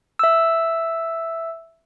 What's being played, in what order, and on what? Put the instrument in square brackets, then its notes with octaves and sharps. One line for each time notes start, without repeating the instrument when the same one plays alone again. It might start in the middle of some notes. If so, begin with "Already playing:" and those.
[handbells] E5 E6